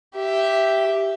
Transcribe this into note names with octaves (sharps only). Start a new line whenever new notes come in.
G4 E5